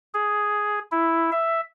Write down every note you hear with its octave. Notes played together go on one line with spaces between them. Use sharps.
G#4
E4
E5